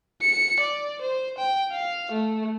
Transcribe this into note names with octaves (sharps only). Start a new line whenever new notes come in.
C#7
D5
C5
G5
F5
A3